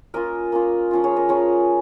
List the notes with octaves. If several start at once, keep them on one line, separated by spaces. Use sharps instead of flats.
A#3 C#4 F4 A#4 D#5
A#3 C#4 F4
F3 C#4 F4
G#4 C#5
A#4 D#5
F3 C#4 F4 G#4 C#5